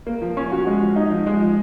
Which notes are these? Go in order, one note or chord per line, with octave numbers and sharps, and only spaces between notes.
A#3
F3
C#4
F#4
G#3
F3
D#4
F3
G#3
F3